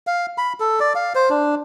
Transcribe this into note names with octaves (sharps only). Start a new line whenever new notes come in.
F5
B5
A4
D5
F5
C5
D4